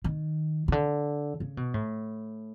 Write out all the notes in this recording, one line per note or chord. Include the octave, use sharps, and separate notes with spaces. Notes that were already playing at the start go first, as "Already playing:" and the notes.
D#3
C#3
D3
C#3
B2
A2